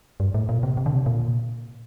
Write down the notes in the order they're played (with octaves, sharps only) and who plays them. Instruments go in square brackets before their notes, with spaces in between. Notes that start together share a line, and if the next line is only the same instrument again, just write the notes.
[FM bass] G2
A2
A#2
C3
C3
D3
C3
A#2